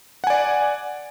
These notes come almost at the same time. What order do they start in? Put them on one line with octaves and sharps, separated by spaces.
F#5 G#5 D5